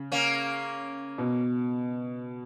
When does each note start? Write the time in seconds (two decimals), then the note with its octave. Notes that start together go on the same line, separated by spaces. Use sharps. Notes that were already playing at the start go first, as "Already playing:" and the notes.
Already playing: C#3
0.12 A#3 C#4
1.18 B2